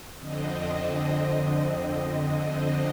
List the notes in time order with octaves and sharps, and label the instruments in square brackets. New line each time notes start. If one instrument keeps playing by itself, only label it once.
[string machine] F2 D3 C4 D#5